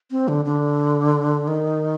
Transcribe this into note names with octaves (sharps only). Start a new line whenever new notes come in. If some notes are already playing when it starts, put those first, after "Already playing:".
C4
D3
D3
D#3